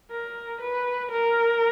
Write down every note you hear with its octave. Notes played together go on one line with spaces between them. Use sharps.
A#4
B4
A#4